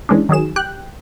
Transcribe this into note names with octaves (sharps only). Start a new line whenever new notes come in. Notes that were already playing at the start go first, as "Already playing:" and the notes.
E3 G#3 C#4 D4
D#3 F#3 G#4 E7
G4 G5 F#6